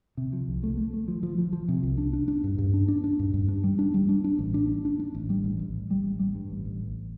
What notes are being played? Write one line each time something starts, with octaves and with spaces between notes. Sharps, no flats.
C3
F3
C2
A3
A3
A3
F3
F3
F3
F3
C3
C2
D4
D4
D4
G2
G2
D4
D4
D4
G2
G2
D4
G3
D4
G3
D4
D4
A1
D4
D4
D4
D4
A1
G3
A1
A1
A1
G3
A1
G3
G2
A1
A1
A1